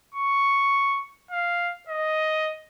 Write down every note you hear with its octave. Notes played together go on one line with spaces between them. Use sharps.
C#6
F5
D#5